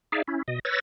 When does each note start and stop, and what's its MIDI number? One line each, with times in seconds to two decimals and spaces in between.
0.12 0.22 63
0.12 0.22 68
0.12 0.22 74
0.12 0.22 76
0.12 0.22 77
0.28 0.42 61
0.28 0.42 64
0.48 0.59 47
0.48 0.59 75
0.65 0.80 71
0.65 0.80 73
0.65 0.80 88
0.65 0.80 93
0.65 0.80 94